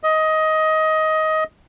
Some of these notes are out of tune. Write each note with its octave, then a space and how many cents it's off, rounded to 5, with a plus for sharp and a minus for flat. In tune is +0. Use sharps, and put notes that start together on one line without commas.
D#5 +15